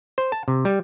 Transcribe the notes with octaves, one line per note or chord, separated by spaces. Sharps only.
C5
A5
C3
G3